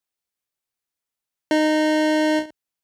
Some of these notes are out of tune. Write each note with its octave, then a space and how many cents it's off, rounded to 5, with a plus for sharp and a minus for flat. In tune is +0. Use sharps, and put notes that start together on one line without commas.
D#4 -15